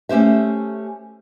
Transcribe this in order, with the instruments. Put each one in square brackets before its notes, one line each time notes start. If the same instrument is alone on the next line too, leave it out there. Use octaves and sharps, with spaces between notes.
[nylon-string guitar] A3 C#4 G4 C5 E5